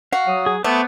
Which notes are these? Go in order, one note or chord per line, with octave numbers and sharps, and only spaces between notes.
F#4 F5
F#3 D#6
G#4
A3 B3 C5 D6